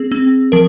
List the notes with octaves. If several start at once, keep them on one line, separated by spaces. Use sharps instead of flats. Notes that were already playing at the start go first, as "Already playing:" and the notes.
Already playing: C4 G#4
C4
F3 A#4